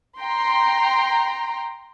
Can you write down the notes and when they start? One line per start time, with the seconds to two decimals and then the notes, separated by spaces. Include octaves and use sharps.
0.21 G5 A#5 C6